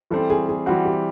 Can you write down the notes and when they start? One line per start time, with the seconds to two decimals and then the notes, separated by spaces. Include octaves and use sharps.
0.11 E3 G3 C4 A4
0.30 G#4
0.49 G#4
0.66 E3 G3 C4 F#4
0.85 G4